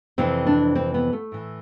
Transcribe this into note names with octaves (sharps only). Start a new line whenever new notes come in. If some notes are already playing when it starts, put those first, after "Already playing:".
F2 C3 E3 C4
D4
C4
B3
A3
A2 E3